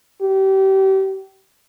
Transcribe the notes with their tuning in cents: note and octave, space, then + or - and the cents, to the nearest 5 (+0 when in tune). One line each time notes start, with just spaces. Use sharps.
G4 -30